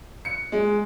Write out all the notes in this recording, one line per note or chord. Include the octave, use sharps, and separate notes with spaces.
C#7
G#3